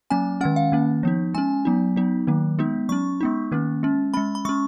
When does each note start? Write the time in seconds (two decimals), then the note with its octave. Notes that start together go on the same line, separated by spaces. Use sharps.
0.10 F#3 A#3 C#4 G#5
0.41 D#3 G#3 C#4 F#5
0.56 F5
0.72 D#3 A#3 C#4
1.03 F3 B3 D#4
1.34 G#3 C#4 G#5
1.65 F#3 B3 D#4
1.96 F#3 B3 D#4
2.27 D#3 F#3 A#3
2.59 G#3 B3 D#4
2.89 F#3 C#4 C#6
3.21 G#3 B3 D#4
3.52 D#3 A#3 C#4
3.83 G#3 C#4
4.14 G#3 C#4 B5
4.35 B5
4.45 G#3 C#4 C#6